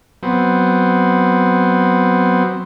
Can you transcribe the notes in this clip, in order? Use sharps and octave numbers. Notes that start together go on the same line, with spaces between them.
F#3 B3 C4